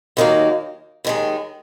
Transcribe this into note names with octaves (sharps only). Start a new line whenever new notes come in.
D#2 D#3 F#3 A#3
D#2 D#3 G#3